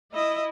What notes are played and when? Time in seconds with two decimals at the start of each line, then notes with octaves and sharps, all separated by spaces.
0.13 E4 D#5